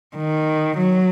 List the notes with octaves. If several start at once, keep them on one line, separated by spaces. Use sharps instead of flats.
D#3
F#3